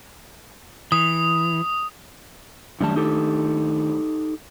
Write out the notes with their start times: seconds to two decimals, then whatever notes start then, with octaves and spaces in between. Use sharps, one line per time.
0.92 E3 D#6
2.81 F#2 D#3 G3 A3 D4 A5
2.96 D#4 G4 A4